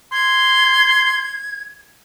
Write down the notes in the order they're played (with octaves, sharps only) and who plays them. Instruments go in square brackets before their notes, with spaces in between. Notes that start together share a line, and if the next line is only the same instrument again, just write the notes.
[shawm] C6 [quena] G#6